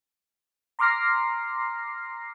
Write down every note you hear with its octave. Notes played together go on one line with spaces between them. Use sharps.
A#5 C6 D6 F6 A#6 C7